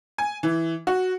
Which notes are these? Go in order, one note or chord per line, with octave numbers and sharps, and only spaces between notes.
G#5
E3
F#4